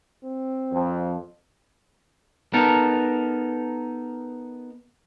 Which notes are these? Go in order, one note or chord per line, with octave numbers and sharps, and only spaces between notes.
C4
F2
B3 D#4 A4 A#4